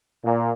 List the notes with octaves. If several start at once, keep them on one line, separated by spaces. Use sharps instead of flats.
A#2